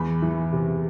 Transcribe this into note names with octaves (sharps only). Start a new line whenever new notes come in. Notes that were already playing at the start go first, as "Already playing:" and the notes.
Already playing: E2 B5
E3
C3